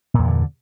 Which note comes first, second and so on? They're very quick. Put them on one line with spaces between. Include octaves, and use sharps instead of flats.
A#2 E2 G2 D3